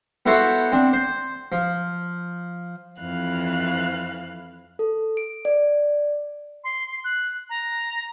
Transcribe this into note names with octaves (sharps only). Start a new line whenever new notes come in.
B3 E4 F#4 A4 C5 C#5
C4 D4
C5
F3
F2 E3 F5 F#6
A4
D7
D5
C6
F#6
A#5